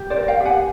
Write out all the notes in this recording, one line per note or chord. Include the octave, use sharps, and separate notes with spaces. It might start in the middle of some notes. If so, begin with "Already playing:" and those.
Already playing: G4
C5 D5
A#4
F5 G5
G4
F#5 G#5